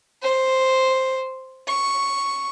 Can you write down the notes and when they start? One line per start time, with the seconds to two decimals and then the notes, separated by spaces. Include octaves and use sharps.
0.23 C5
1.68 C#6